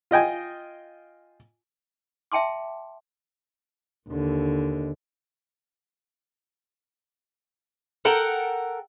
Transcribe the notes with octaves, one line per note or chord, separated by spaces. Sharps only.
F4 D#5 G5 G#5
E5 G5 A5 C6 D6
D#2 D3
A4 A#4 F#5 G5